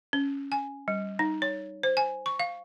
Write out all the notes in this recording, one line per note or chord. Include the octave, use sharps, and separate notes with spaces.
C#4
G#5
G3
D#4
C#5
C5
G#5
C#6
F5